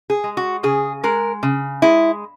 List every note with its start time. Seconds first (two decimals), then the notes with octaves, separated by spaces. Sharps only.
0.10 G#4
0.24 G#3
0.37 F#4
0.63 C#3 G#4
1.04 G#3 A#4
1.43 C#3
1.82 G#3 E4